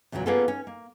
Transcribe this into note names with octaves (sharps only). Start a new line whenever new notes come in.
E2 A#2 C#3 F3 F#3
A#3 B3 C#4 F4 G#4 A4
C#4
A#3